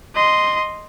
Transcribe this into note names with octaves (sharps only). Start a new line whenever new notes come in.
D#5 C6